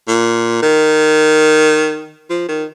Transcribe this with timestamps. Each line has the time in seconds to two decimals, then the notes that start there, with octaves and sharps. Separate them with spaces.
0.07 A#2
0.62 D#3
2.30 F3
2.48 D#3